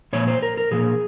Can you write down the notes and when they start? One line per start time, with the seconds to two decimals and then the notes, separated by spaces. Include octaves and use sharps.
0.13 A#2 F3 A#3 C#5
0.28 C5
0.42 A#4
0.57 A#4
0.71 A#2 F3 A#3 G#4